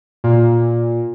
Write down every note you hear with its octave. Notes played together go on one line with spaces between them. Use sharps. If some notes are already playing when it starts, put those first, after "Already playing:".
A#2